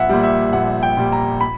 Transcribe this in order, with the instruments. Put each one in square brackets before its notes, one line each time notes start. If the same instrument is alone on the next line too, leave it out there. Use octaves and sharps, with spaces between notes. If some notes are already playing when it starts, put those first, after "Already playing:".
Already playing: [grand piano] A#1 E5 F#5
A#2 G3
E5
A#1 F#5
G5
A#2 G3
A#5
B5